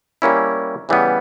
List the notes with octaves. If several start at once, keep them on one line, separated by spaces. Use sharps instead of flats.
G3 A#3 C#4 E4
C#3 E3 G3 B3